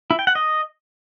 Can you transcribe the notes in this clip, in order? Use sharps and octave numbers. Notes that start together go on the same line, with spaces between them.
E4
G5
F#5
D#5